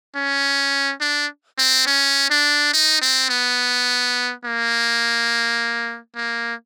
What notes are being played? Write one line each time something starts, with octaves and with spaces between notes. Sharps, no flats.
C#4
D4
C4
C#4
D4
D#4
C4
B3
A#3
A#3